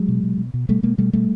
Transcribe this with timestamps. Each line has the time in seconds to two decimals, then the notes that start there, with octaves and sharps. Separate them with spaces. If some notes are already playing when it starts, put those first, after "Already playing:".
Already playing: F#3 G#3
0.08 B2
0.23 B2
0.38 B2
0.54 B2
0.69 B2 G3 A3
0.83 B2 G#3 A#3
0.98 B2 G3 A3
1.13 B2 G3 A3